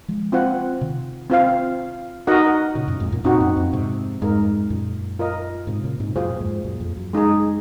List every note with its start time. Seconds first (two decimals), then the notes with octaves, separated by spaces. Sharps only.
0.08 F3 G#3
0.32 C4 F4 C5 F#5
0.81 C3 D#3
1.30 C4 F4 C5 F5
2.27 D#4 F#4 A#4 D#5 F#5
2.75 A#2 C#3
2.88 F#2 A#2
3.00 F2 G#2
3.12 F#2 A#2
3.24 F#2 A#2 C4 D#4 F#4
3.40 F#2
3.56 F2
3.73 G#2 C3
4.21 F2 G#2 G#3 D#4 A#4
4.70 F#2 A#2
5.19 F4 A#4 D#5
5.67 G#2 C3
5.83 A#2 C#3
6.00 G#2 C3
6.16 F#2 A#2 F4 G#4 C5
6.30 A#2
6.41 F2 G#2
6.64 F#2 A#2
6.80 F2
6.97 F#2
7.13 G#3 D#4 G#4